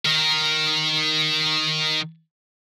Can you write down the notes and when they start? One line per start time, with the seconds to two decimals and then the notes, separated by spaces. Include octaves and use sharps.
0.06 D#3 A#4